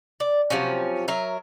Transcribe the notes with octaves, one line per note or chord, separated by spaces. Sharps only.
D5
C3 F3 F#3 C#4
F#3 A#4 E5